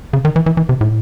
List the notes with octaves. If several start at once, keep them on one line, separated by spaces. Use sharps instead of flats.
C#3
D#3
E3
E3
E3
C3
A2